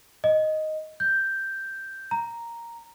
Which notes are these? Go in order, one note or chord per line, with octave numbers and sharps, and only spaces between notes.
D#5
G6
A#5